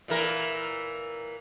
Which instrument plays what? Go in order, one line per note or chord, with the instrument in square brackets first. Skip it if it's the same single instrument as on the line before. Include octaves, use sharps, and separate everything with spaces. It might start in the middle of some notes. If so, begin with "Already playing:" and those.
[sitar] A#2 E3 A#4